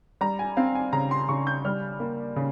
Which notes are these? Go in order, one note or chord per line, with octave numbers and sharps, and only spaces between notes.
G3 A#5
G#5
C4 F5
G#5
C#3 A#5
C6
C#3 C#6
G6
G3 F6
A#3
C#3